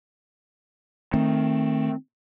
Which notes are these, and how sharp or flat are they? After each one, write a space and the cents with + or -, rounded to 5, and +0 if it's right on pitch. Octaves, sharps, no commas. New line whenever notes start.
D#3 +0 A3 +10 C4 +10